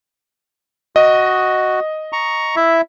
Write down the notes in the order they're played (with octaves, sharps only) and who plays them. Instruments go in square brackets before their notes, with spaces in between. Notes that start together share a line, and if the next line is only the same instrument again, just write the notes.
[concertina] F#4 [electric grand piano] D#5
[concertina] A#5 C#6
E4 E5